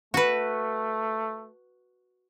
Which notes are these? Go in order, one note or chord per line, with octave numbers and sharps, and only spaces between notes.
A3 F#4 B4